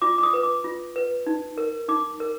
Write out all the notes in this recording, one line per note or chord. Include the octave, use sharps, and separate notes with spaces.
F4 D6
D6
D#6
B4
D6
F4
B4
D#4
A#4
D#4 D6
A#4